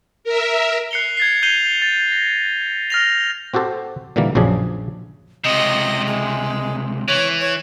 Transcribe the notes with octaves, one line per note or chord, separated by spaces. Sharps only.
A#4 E5
F#6 C7 C#7 F7 G7
G#6 A6 C7
G6 C7 D#7 F7 G7
A6
A#6
F6 A#6 F7
C4 F#4 G4 A4 C5
A#2 D3 E3 G3 A#3
A#1 F#2 C#3 F3 D4 G#4
C#2 C3 D#5
G#3
E3 C#5
C#5